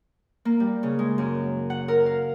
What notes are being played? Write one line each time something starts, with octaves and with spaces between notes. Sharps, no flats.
A#3
G3
C#3
G#3
F#2
F#5
A#4
F5